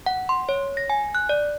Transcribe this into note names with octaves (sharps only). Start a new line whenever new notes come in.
F#5
C6
C#5
A#6
G#5
F#6
D5